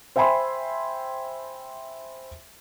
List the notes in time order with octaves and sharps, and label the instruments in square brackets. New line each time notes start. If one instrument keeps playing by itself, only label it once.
[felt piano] C5 E5 G5 G#5 B5 C6